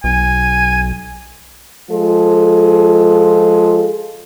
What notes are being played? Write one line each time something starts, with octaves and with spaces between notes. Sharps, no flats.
B1 G#5
F3 G#3 F4 A4